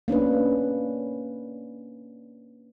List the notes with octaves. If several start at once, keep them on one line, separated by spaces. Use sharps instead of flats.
A#3 C#4 D4 B4